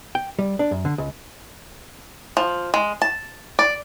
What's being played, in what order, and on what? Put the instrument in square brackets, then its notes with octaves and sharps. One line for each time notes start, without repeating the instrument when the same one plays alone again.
[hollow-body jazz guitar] G5
G3
D4
F#2
D3
C#2
[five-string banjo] F3
G#3
A5
D5